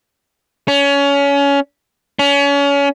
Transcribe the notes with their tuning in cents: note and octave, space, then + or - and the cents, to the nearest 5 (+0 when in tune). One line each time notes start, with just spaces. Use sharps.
C#4 +25
C#4 +30